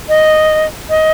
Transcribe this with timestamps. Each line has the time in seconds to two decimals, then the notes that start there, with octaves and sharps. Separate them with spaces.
0.09 D#5
0.89 D#5